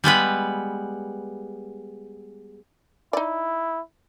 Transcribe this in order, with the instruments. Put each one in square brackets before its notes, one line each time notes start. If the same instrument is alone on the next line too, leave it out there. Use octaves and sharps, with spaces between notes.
[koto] G3 G#3 B3 B4
[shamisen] D#4 D5 [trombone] E4